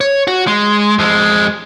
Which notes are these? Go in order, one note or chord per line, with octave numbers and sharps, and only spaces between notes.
C#5
F#4
G#3
F2 G#3